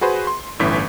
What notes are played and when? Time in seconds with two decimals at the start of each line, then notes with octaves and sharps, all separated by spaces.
0.01 F#4 G#4 B4 C5
0.27 C6
0.60 G1 A2 E3 C#4 C#5 B6